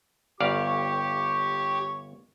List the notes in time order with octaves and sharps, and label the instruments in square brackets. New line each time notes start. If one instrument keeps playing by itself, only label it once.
[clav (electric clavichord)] G1 D5 F5 [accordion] G4 [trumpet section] C#5 C#6